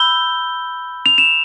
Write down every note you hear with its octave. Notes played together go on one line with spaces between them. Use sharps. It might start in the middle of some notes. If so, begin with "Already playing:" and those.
Already playing: B5 E6 G6 G7
F7
E7